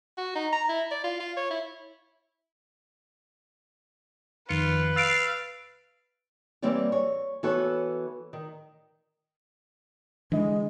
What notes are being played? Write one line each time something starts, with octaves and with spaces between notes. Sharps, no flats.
F#4
D#4
A#5
E4
D5
F4
F4
C#5
E4
F2 D#3 F4 B4 C#7
F5 E6 A6 D7
E3 G3 A#3 C4 C#5 D5
C#5
E3 B3 F#4 A4 B4 C#5
D#3
D3 E3 G#3 D#5